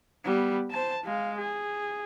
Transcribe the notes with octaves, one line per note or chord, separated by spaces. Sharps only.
G3 B3
C5 A5
G#3 F5
G#4